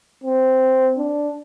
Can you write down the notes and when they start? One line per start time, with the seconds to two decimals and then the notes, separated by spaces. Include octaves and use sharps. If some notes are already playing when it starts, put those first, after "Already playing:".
0.24 C4
0.97 D4